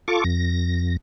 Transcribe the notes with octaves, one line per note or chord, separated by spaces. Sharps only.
F4 A4 C#6 D6
F2 A#6